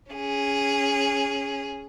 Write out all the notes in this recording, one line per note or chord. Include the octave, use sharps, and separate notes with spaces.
C#4 G#4